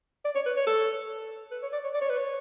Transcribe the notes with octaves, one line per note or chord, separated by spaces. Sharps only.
D5
C#5
B4
C#5
A4
B4
C#5
D5
C#5
D5
C#5
B4
C#5